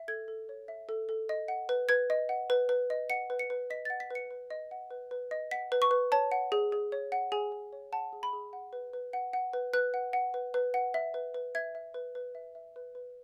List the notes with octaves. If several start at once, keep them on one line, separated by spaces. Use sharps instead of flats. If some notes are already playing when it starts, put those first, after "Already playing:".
Already playing: E5
A4 G#6
A4
C#5
E5
A4
A4
D#5
F#5
B4
B4 G#6
D#5
F#5
B4
B4
D#5
F#5 C#7
B4
C#7
B4
D#5 B6
F#5 A6
B6
B4 C#7
B4
D#5
F#5
B4
B4
D#5
F#5 B6
B4
C#6
B4
C#5 A5
F#5
G#4
G#4
C#5
F#5
G#4 G#5
G#4
C#5
F#5 A5
G#4
B5
G#4
F#5
B4
B4
F#5
F#5
B4
B4 F#6
F#5
F#5
B4
B4
F#5
E5
B4
B4
E5 G#6
E5
B4
B4
E5
E5
B4
B4